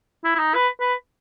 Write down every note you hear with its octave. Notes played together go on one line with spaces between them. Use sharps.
E4
E4
D#4
B4
B4